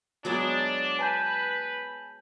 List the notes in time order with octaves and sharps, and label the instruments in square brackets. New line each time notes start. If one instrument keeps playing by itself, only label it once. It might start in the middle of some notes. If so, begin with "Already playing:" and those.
[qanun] F#3 G#3 B3 [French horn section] D4
[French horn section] B4 [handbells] G#5 A5 G6